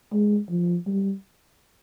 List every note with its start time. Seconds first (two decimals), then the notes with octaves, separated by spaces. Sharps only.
0.13 G#3
0.50 F3
0.86 G3